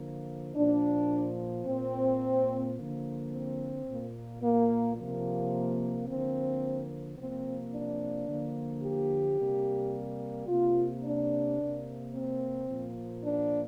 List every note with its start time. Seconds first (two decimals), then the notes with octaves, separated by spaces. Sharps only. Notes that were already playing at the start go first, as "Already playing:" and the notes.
Already playing: D3 F3 A#3
0.56 A#2 F3 A#3 D4
1.65 A#2 A#3 C4
2.76 D3 F3 A#3
3.31 C4
3.86 A#2 A#3
4.42 A#3
4.97 C3 F3 A#3
6.07 D3 F3 A#3 C4
7.17 C3 F3 A#3 C4
7.72 D4
8.27 D3 F3 A#3
8.82 G4
9.38 C3 G3 A#3
10.48 C3 A#3 F4
11.03 D4
11.58 C3 A#3
12.13 C4
12.68 A#2 F3 A#3
13.22 D4